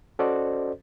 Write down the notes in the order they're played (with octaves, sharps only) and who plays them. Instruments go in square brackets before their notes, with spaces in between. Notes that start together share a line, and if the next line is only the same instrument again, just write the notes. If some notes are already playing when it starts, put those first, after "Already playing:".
[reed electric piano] C#4 F#4 A4 C5 D5 D#5